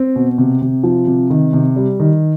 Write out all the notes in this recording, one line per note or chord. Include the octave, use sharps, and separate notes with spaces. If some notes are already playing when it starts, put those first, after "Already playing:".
Already playing: C4
B2
C3
C3
F3
C3
D#3
C3
G3
D#3